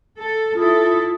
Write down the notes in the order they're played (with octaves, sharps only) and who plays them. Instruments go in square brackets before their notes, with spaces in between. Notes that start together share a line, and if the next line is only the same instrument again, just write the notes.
[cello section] A4
[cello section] E4 A4 [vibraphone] F4 D#6